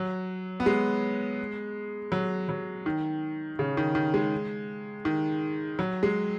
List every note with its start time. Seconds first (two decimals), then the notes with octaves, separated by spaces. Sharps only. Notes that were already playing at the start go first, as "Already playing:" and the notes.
Already playing: F#3
0.60 B3
0.66 G#3
2.12 F#3
2.49 F#3
2.86 D#3
3.59 C#3
3.77 D#3
3.95 D#3
4.14 G#3
5.05 D#3
5.79 F#3
6.03 G#3